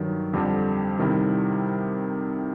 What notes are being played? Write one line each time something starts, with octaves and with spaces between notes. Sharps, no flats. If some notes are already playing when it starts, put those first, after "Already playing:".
Already playing: G2 D#3 F#3
F2 D3 G3 C4
C3 D#3 G3 C4 E4